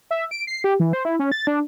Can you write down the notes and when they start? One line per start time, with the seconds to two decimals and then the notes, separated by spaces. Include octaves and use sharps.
0.11 E5
0.31 D7
0.47 C7
0.64 G4
0.80 E3
0.93 C5
1.05 E4
1.19 C#4
1.32 A6
1.47 D4